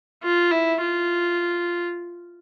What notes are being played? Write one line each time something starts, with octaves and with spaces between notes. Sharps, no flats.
F4
E4
F4